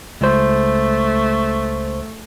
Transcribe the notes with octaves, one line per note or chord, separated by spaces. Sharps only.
C#2 A3 C5